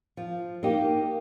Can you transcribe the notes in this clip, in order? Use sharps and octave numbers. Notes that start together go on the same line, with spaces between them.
F3
A#3 D#4 G4